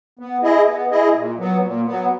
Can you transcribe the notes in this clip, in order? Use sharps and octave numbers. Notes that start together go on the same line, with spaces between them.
B3
E4 G#4 D#5
B3
E4 G#4 D#5
A#2
F#3 B3
A#2
F#3 B3